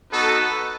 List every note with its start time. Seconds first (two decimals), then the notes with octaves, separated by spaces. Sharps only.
0.11 B3 D#4 F#4 A4 B4